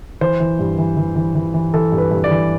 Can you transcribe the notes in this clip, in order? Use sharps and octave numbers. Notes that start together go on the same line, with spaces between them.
E3 C5
E3
G2
E3
E3
E3
E3
E3
E3 A4
G2
B4
G2
D5
E3